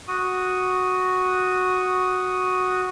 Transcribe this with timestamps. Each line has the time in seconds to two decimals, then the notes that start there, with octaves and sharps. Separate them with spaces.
0.08 F#4 D#6